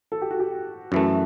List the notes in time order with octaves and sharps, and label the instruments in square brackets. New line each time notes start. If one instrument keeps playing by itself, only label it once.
[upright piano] A4
G4
F#4
G4
[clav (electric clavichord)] F#2 E3 A3 [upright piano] F#4